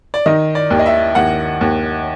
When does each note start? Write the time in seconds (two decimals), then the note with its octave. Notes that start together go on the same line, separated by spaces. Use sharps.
0.14 D5
0.26 D#3 D#5
0.55 D5
0.70 D#2
0.79 D#5
0.86 E5
1.15 D#2 F#5
1.61 D#2